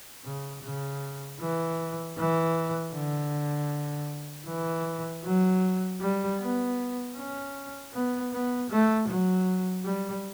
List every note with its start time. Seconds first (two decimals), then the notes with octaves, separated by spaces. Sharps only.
0.24 C#3
0.63 C#3
1.40 E3
2.18 E3
2.93 D3
4.47 E3
5.24 F#3
6.01 G3
6.40 B3
7.16 C#4
7.93 B3
8.32 B3
8.70 A3
9.08 F#3
9.84 G3